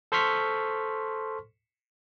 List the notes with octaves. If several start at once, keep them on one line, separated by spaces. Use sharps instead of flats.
A4 C5 C6 C#6 F6 B6